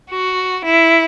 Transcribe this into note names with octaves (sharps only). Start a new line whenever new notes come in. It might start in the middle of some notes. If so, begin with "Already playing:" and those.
F#4
E4